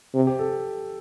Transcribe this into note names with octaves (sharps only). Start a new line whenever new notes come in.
C3
G4
A4